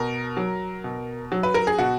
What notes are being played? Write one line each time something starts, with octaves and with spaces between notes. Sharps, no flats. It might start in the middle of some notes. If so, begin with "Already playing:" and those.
Already playing: B2 A#4
F#3
B2
F#3
B4
A#4
G#4
B2 F#4